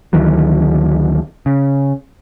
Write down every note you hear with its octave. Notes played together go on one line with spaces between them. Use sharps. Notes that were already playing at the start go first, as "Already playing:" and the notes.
D2 D#3 E3 F#3
C#3